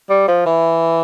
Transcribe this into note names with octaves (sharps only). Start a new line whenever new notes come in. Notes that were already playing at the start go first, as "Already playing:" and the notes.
G3
F3
E3